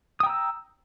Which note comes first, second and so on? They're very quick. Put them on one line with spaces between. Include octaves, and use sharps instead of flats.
D#6 G5 A#5 E6